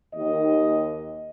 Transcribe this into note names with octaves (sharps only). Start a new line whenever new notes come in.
D#2 D#5